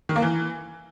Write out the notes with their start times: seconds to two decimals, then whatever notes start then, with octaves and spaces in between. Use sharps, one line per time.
0.09 D#3
0.16 A#3
0.22 E3